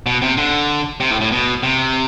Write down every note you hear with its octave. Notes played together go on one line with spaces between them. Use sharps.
B2
C3
D3
C3
A2
A2
B2
C3